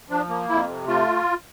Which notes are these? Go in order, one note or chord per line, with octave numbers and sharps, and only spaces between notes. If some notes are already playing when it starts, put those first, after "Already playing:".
F3 D4
A#3
F2 E4
C3
A3 F4